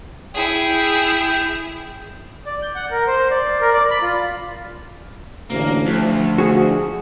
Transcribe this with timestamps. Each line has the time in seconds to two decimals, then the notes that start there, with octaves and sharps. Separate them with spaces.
0.34 E4 G#4 G5
2.46 D5
2.62 G6
2.75 F#5
2.91 A#4
3.07 C5
3.31 D5
3.61 A#4
3.74 D5
3.90 B5
4.02 F4
5.50 A1 D2 A#3
5.86 D2 F3
6.38 F#4 G#4